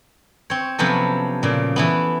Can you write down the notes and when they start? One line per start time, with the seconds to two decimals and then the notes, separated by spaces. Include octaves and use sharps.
0.50 C4 C#5
0.79 C3 F3 F#3 B3 C#4 A4
1.43 A#2 C#3
1.76 E3 A3 B3